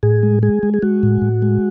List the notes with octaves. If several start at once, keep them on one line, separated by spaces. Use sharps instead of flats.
A2 G#4
G#3
G#3 G#4
G#3
G#4
G#3 F#4
A2
A2
G#3